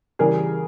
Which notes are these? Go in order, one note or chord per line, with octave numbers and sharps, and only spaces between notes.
C#3 E3 G3 G#4 A#4